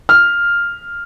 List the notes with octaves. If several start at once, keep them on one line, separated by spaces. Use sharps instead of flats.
F6